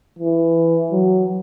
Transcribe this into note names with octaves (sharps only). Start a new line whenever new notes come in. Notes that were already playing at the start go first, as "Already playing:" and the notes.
E3
F#3